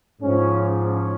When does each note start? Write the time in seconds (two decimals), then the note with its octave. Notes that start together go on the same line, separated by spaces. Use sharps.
0.21 G#2 F3 C#4
0.83 C#4